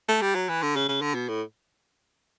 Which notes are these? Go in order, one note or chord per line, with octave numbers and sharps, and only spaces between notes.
A3
G3
F#3
E3
D3
C#3
C#3
D3
B2
A2